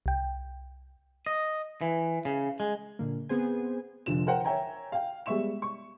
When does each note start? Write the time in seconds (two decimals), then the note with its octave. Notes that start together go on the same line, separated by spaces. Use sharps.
0.06 C2 G5
1.26 D#5
1.81 E3
2.25 C#3
2.60 G#3
2.99 A#2 D3 A#3
3.29 B3 C4 G#4 C5 G#5
4.06 F1 D3 F3 E7
4.27 A#4 C5 F#5 G5
4.44 C#5 E5 G5 G#5 A#5
4.92 F5 G5
5.26 G3 G#3 B3 E5 C#6 E7
5.62 C#6